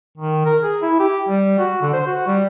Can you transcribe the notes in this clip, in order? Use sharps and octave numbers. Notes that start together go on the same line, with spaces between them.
D#3
A#4
G#4
E4
G4
G3
F#4
D3
C5
F#4
G3